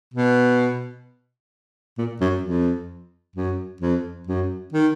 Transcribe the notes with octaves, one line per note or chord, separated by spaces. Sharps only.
B2
A#2
F#2
F2
F#2
F2
F#2
D#3